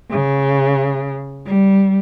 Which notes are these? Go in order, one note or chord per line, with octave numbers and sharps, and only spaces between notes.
C#3
G3